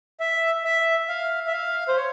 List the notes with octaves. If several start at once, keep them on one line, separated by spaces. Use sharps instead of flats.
E5
E5
F5
E5
F5
C5
C#5